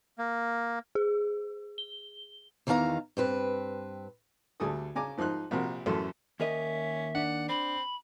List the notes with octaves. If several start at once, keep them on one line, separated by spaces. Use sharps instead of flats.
A#3
G#4
G7
E2 D#3 E3 A4 F5 A#5
G2 C4 B4
D2 G3 G#4 A4 D#6
C#3 G#5 A#5 D6
G#2 F3 D#4 C6 F#6
A#1 C3 F#4 A#4 C6
A1 F#2 A3 A4 C6
D#2 C#4 A#4 D#5 E5
D4 F#5
C4 B5